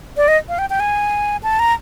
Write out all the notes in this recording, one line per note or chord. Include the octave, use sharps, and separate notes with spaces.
D5
D#5
F5
G5
G5
G#5
A5
A#5